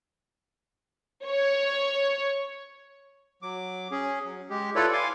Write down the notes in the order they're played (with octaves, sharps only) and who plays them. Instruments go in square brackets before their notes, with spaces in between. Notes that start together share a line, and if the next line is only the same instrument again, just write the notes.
[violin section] C#5
[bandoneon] F#3 D6
C#4 G#4
F#3
G#3 G4
E4 F4 A4 B4 C#5 D5
F5 G#5 C6 D6